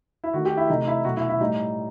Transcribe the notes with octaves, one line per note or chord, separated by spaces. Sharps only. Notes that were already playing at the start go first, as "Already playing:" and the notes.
E4
D#3 A3 F#4
G4
E4
C3 E3 A3 D#4
E4
B2 F#3 A3 F#4
E4
E4
A2 G3 D#4